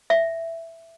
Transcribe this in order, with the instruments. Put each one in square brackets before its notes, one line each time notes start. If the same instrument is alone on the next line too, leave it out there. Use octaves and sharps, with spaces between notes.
[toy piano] E5